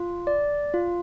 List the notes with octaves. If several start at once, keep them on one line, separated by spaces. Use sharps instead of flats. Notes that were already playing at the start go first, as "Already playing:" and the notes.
Already playing: F4
D5
F4